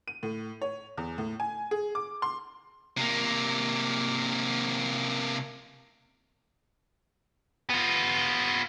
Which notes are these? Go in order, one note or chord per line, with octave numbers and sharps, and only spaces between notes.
D#7
A2
C#5
E2
A2
G#5
G#4
D6
C6
C3 A#3
B3 F4